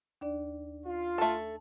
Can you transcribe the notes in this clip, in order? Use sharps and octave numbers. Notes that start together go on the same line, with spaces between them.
D#2 D4 D5
F4
A3 A4 A5